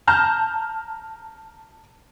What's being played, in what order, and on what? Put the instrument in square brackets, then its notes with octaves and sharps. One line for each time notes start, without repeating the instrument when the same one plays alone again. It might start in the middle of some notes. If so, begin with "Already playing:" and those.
[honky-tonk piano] A5 A#5 F6 G6